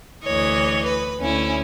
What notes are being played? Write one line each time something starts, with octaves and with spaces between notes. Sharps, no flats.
D2 E3 C#5 D#5
B4
D2 C#4 E4